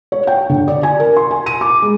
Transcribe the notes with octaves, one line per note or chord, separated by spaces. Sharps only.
C#5
G5
D3
D5
G#5
A#4
C6
G#5
D#7
D6
G#3